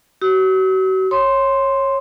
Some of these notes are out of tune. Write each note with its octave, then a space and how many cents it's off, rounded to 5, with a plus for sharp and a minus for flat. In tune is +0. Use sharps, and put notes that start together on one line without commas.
F#4 +40 E6 -45
C#5 -20 C6 +0 D#6 -10